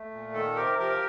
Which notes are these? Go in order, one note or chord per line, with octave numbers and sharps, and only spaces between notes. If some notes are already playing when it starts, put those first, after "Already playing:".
Already playing: A3
A#2
D#3 A4
C3 G4 A#4
F3 G4 A#4